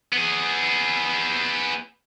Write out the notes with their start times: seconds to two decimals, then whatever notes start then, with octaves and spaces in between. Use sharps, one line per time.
0.13 B3 G#4